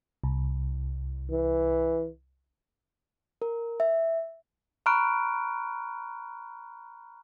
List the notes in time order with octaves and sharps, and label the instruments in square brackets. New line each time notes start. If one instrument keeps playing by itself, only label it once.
[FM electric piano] C2
[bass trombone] E3
[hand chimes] A#4
E5
[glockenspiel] A#5 B5 C#6 F6 F#6 D7